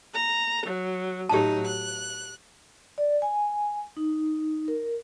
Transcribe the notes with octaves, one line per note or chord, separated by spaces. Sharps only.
A#5
F#3
A2 F#3 D#4 G4 A5
F#6
D5
G#5
D#4
A#4